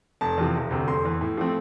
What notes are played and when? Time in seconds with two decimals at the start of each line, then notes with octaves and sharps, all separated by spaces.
0.21 F1 A5
0.38 E2 C3 F3
0.55 E1
0.71 D2 C3
0.87 F1 C6
1.04 E2 E3
1.21 A2
1.37 F3 A3 C4